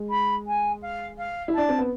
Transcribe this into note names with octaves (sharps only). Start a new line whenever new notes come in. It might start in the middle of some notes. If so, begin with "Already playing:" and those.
Already playing: G#3
B5
G#5
F5
F5
E4
D4 A5
C4
B3